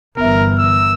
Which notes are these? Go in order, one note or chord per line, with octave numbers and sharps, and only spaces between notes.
G1 E3 B3 A#4 E5
E6